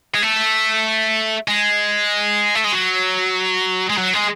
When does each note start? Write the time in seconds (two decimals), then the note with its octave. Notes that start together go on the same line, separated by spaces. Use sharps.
0.15 G#3
0.23 A3
1.48 G#3
2.55 A3
2.64 G#3
2.73 F#3
3.89 G#3
3.97 F#3
4.13 G#3